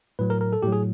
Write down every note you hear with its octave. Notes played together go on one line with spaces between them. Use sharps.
A2 F#3 B4
A#4
A#4
A4
A2 F#3 G4
G#4